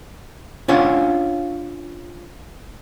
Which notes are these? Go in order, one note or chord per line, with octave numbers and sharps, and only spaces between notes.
C#4 D4 F4 C#5 F5 F#5